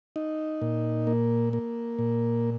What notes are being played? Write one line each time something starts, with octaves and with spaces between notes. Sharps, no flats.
D#4
A#2
A#3
A#3
A#2